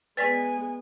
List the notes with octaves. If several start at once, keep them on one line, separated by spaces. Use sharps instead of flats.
G#3 B3 B4 D5 G#5 C6 A6 B6